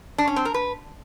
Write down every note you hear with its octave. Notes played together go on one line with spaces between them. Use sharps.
D4
C#4
C4
A#4
B4